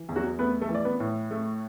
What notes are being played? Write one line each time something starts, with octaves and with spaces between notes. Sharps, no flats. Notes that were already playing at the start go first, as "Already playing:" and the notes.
Already playing: E3
E2
F#3 F#4
A3 B3 B4
A3 A4
E3
D5
B3 B4
A2
A3